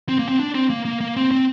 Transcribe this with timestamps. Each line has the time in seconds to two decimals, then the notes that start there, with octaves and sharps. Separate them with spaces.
0.09 C4
0.19 A#3
0.29 C4
0.39 D4
0.55 C4
0.70 A#3
0.85 A#3
1.01 A#3
1.17 C4
1.31 C4